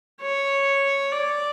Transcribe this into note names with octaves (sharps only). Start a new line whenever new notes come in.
C#5
D5